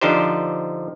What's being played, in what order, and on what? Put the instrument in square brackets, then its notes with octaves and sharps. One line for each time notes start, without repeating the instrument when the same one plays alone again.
[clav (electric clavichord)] D3 F3 D4 D#4 G4 C5